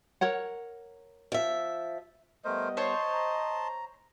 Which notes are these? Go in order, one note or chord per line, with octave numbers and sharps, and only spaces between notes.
A#4 C#5 F#5
F3 E5
G3 A3 B3 A#4 C5 D#5
C5 C#5 A5 C6
A#5